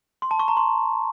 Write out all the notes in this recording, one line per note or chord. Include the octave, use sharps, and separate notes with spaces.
C6
A5
C#6
A#5
C6